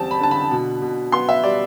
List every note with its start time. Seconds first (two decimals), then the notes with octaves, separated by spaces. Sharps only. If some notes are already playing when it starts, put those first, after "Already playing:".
Already playing: E2 G3 C4 A5
0.11 B5
0.20 D3 A5
0.31 B5
0.51 B2
0.82 B2
1.12 B3 C6
1.29 E5
1.43 G3 D5